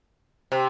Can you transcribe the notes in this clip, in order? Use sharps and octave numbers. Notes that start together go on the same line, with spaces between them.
C3